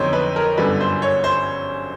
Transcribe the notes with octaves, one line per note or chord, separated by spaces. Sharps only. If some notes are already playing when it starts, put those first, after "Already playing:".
Already playing: F2 D3 F#3 B3 D#4 C5 C#5
B4
A#4
G1 F#2 D3 G3 B4
C5
C#5
C5